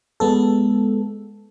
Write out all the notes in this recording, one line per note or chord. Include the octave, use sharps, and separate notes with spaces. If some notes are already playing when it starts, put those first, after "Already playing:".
G#3 B3 A4